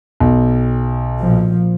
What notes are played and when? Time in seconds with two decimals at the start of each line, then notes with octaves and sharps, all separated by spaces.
0.20 B1
1.22 A#2 F3